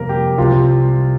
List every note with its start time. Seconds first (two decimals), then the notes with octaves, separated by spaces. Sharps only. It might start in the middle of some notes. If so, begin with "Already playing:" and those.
Already playing: F2 C3 G3 A#3 A#4
0.09 G4
0.37 C2 C3 G3 F4